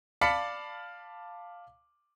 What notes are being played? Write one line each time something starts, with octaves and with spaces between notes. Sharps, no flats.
D5 F5 A5 B5 B6 C#7